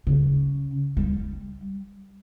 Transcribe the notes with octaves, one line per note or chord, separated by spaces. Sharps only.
C#3
G3